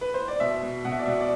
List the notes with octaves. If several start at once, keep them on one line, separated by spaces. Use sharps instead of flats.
B4
C5
D5
B2 E5
B2
B2 F#5
E5
D5
B2 E5
D5